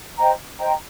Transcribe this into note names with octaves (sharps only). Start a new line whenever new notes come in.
C5 D#5 G5 A#5
C5 D#5 G5 A#5